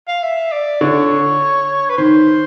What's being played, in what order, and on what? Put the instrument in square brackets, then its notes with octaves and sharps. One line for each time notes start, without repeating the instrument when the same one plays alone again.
[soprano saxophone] F5
E5
D5
[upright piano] D3 [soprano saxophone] C#5
[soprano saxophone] B4
[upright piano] D#3 [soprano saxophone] C5